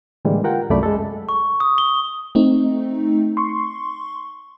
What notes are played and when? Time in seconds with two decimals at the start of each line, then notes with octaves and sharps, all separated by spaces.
0.25 A2 D3 E3 G3 G#3 A#3
0.44 F4 A#4 F#5 G5
0.70 C2 F#2 A3 A4 D5 B5
0.83 G#3 A4
1.29 C#6
1.60 D#6
1.78 G7
2.35 A3 C4 D#4
3.37 C6 C#6